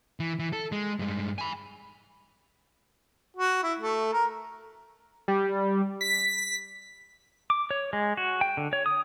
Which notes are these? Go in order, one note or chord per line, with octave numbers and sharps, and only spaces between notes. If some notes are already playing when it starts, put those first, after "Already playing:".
E3
E3
A4
G#3
G2 G#3
G#5 B5
F#4
E4
A3
A#4
G3
B6
D6
C#5
G#3
F#4
G5
D3
C#5
D#6